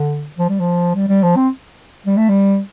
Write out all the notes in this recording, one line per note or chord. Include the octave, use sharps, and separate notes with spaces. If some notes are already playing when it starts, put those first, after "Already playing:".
Already playing: D3
F3
G3
F3
G3
G3
F3
C4
G3
A3
G3